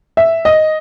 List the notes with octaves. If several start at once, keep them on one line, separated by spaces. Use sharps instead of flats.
E5
D#5